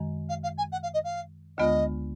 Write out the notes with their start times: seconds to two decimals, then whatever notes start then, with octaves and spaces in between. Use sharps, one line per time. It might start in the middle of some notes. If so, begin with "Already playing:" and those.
Already playing: F#2 D#3 G#3
0.29 F5
0.43 F5
0.57 G#5
0.72 F#5
0.82 F5
0.93 D#5
1.04 F5
1.58 D2 D3 G#3 B3 F4 D#5